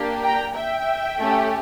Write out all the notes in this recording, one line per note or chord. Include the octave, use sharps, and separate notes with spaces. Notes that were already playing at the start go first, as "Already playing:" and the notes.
Already playing: A#3 D4 G4
G5 A#5
E5 G5
A3 C#4 G4